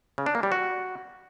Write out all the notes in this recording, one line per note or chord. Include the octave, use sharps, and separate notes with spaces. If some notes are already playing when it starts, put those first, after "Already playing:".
C#3
D4
A#3
G3
F#4